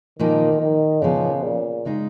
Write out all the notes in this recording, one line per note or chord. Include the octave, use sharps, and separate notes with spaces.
A#2 D#3 F3 A#3 D#4
D#3
A#2 C#3 F3 B3
A#2
C#3 G#3 D#4